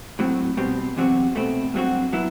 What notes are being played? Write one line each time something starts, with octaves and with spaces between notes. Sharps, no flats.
A2 F#3 C4
B2 G3 C4
E2 C3 F#3 C4 F#4
B2 A3 C4
G2 F#3 C4 F#4
F#3 B3 E4